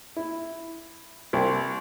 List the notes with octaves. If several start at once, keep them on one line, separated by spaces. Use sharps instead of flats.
E4
C2